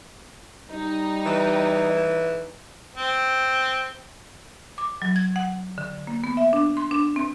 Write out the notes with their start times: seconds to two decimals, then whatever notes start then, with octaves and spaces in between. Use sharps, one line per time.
0.71 G3 D#4
1.26 E3
2.95 C4
4.78 D6
5.02 F#3
5.16 G#6
5.36 F#5
5.78 D3
6.07 A#3
6.24 B3
6.37 E5
6.53 D4
6.77 C6
6.91 D4
7.16 C4